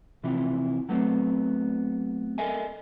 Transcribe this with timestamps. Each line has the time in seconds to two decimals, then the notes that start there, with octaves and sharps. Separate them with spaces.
0.24 C3 E3 F3 E4
0.89 F#3 A3 B3 C4
2.38 A4 A#4 D#5 E5 G#5